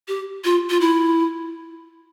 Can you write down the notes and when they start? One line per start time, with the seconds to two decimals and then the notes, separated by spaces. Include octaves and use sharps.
0.08 G4
0.44 F4
0.70 F4
0.81 E4